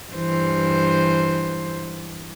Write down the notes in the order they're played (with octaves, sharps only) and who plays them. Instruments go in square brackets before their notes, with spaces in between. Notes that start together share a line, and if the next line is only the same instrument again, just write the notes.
[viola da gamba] G2 E3 C5